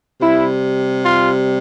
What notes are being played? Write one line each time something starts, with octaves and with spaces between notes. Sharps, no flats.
C3 G3 E4
F4